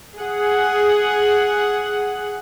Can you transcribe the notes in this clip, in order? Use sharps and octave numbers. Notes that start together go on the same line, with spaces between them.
G#4 F#5